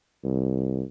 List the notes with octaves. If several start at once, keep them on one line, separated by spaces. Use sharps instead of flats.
C2